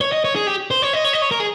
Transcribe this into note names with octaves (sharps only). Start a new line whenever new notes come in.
C#5
D#5
C#5
G#4
G4
C5
C#5
D#5
C#5
D#5
C#5
A#4
G#4